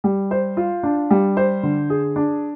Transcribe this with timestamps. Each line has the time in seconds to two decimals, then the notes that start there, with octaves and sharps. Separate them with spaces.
0.04 G3
0.31 C5
0.57 F4
0.83 D4
1.11 G3
1.37 C5
1.63 D3
1.90 G#4
2.16 D4